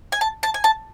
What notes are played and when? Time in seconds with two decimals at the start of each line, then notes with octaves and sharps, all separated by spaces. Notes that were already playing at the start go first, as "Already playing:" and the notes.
0.12 G#5
0.21 A5
0.43 A5
0.54 G#5
0.64 A5